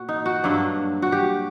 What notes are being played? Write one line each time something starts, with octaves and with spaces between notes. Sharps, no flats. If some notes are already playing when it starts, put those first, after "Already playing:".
Already playing: A#2 F#4
D#4
F#4
G2 F#3 A#3 D4
F#4
G4